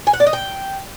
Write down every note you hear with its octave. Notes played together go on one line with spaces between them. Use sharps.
G#5
F#5
D5
D#5
G5